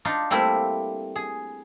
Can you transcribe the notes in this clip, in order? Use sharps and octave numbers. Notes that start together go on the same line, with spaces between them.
D4 D#4 F4
G3 A3 A#3 C4 E4
G#4